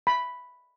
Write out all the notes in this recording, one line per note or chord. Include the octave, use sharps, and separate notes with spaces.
B5